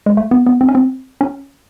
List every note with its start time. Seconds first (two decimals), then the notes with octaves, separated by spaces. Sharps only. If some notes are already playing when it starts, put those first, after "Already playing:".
0.06 G#3
0.17 A3
0.31 B3
0.46 B3
0.61 C4
0.69 C#4
0.75 C4
1.21 C#4